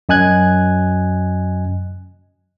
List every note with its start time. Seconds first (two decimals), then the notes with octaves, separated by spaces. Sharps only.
0.09 F#2 D#5 G#5 F#6 G#6